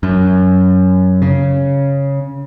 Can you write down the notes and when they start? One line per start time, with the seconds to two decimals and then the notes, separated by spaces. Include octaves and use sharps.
0.03 F#2
1.22 C#3